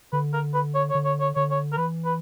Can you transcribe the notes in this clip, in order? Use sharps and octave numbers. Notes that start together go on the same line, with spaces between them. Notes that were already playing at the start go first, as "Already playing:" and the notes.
D3 B4
A#4
B4
C#5
C#5
D3
C#5
C#5
D3 C#5
C#5
A#4
E3 B4
B4